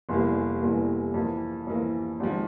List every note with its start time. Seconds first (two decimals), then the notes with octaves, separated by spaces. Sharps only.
0.09 F1 E2 E3 G3 A#3
0.62 F1 E2 E3 G3 A#3
1.14 F2 E3 A#3
1.67 F2 E3 A#3
2.20 G#1 G#2 F3